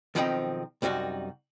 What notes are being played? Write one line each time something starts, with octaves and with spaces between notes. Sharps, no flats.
B1 D#3 F3 B3 C4 D#4
C2 F#2 G3 D#4 F#4